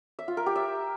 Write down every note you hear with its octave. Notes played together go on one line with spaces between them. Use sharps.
E5
F4
A#4
G4
E5